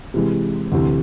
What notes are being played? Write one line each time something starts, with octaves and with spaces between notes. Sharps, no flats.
C3 E3 G#3
D2 C3 E3